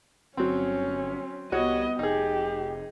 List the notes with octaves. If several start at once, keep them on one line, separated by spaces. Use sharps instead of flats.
G1 F#3 C4 C#4
C2 G3 B3 F#4 C#5 D#5
F1 D#4 G4 G#4